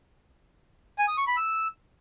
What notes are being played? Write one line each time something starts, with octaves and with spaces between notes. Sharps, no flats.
G#5
D#6
C#6
B5
E6